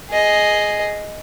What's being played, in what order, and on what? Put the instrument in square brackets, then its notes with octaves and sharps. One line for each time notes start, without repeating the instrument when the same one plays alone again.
[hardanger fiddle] G#4 D#5